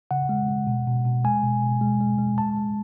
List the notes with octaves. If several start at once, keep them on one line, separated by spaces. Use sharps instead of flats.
C#3 F#5
G#3
G#3
B2
B2
B2
G#3 G#5
B2
B2
G#3
G#3
G#3
G#3 A5
G#3